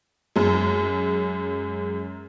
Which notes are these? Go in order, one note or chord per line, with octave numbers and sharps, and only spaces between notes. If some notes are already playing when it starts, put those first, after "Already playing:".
F#2 G#3